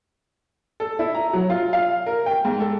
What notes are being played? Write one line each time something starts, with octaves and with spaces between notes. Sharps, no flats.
A4
E4
A#5
F#3
F4
F5
A#4
G5
G#2
A4